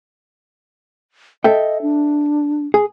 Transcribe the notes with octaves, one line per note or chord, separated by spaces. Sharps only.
A4 D#5 E5 G5
D4
G#4